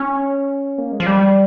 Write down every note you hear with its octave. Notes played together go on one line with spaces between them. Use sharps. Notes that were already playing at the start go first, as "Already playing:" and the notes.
Already playing: C#4
A#3
G#3
F3
G3